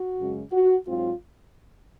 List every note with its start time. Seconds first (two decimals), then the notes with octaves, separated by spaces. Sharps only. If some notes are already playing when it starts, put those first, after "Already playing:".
Already playing: F#4
0.18 F#2 C#3 G#3 C#4
0.52 F#4
0.87 G#2 F#3 C4 F4